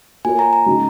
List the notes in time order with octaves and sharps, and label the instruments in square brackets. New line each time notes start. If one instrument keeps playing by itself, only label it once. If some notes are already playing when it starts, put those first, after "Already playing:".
[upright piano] A#3 F4 A#4 C#5 [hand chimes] G#5
[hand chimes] A#5
A#5
[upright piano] C#3 G#3 D#4